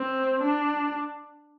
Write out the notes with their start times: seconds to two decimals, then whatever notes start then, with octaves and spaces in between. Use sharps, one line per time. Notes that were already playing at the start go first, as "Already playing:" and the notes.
Already playing: C4
0.42 D4